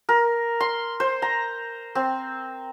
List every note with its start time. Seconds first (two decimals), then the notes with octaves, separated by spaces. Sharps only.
0.09 A#4
0.60 C6
1.00 C5
1.22 A#5
1.95 C4